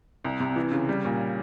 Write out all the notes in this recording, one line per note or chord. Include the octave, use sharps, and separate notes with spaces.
C2
C3
E3
C#3
G3
A#2